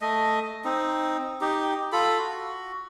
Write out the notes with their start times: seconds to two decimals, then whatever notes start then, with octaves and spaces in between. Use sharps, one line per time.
0.01 A3 D#5
0.65 C4 D#4
1.41 D#4 G4
1.92 F4 A4 B5
2.19 F#4